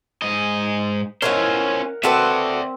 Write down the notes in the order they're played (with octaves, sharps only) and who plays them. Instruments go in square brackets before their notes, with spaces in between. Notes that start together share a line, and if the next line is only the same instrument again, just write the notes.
[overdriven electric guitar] G#2 D#5
[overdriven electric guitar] C#4 C5 [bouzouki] E4 F4 C#5 [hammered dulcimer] A#4 F#5
[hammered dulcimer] C4 [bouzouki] F#4 A4 B4 [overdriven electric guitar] D5 E5